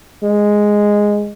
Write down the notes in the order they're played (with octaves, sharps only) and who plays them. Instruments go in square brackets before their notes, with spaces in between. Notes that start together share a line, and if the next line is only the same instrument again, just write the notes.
[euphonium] G#3